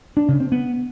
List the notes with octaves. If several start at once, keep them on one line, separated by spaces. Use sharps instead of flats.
D4
C#3
C4
B3